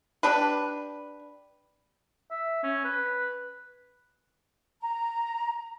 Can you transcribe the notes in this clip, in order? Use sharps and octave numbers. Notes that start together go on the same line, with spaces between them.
D4 G4 B4
E5
C#4
B4
A#5